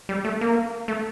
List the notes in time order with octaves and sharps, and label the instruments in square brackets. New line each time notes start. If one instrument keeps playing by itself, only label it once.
[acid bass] G3
A3
A#3
A3